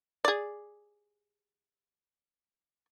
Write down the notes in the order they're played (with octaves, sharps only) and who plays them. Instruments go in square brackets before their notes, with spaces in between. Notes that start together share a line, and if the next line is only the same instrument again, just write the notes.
[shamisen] G#4 D5